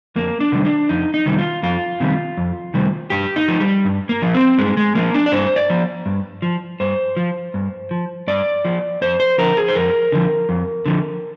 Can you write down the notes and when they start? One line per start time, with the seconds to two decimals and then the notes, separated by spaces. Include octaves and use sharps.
0.16 F2 A#3
0.40 D4
0.52 C3 D#3 G3
0.65 D4
0.89 F2 D#4
1.14 D#4
1.26 C3 D#3 G3
1.38 F4
1.63 F2 F4
2.00 C3 D#3 G3
2.37 F2
2.74 C3 D#3 G3
3.10 G2 G4
3.36 D#4
3.48 F3
3.60 G3
3.85 G2
4.09 A#3
4.22 F3
4.34 C4
4.58 G2 G#3
4.77 G#3
4.95 F3 A#3
5.14 D4
5.26 D5
5.32 G2 C5
5.56 D5
5.70 F3
6.06 G2
6.42 F3
6.80 G2 C5
7.17 F3
7.54 G2
7.91 F3
8.28 G2 D5
8.65 F3
9.01 F2 C5
9.20 C5
9.38 D3 F3 A#4
9.57 G#4
9.68 C5
9.75 F2 A#4
10.12 D3 F3
10.49 F2
10.86 D3 F3